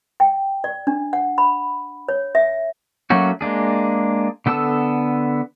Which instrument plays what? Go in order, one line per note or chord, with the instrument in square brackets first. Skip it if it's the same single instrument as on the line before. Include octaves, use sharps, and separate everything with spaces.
[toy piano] G5
D5
D4
F#5
B5
C#5
E5
[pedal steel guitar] F#3 A3 A#3 C#4 F#4
G#3 A#3 D4 G#4
D3 B3 A4 A5 E6